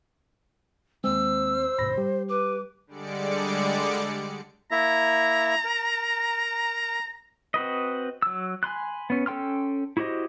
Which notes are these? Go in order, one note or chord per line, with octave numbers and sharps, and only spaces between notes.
D#2 G#3 C4 C5 E6
D2 G#2 B2 B5 A#6
G3 G4
B4 D6
D3 G3 G#3 D5 D6 C#7
A#3 E4 E5 A#5
A#4
C4 F#4 B4 D#5
F#3 E6
G#5 B5 C6 F#6
B3 C#4
C#4 A4 G5 C6 F6
E4 F#4 G4 C5 D#5